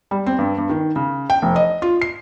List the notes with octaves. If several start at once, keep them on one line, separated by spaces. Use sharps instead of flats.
G3
C4
G2
G2
D#3
C#3
G5
F1
D#5
F4
C7